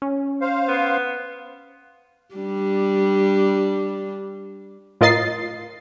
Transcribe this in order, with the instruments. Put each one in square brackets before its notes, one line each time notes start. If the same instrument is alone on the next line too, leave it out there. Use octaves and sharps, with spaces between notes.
[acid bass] C#4
[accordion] C5 F5
[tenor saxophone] B3
[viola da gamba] G3 D4
[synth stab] A2 F4 A#4 D#5 A6 C7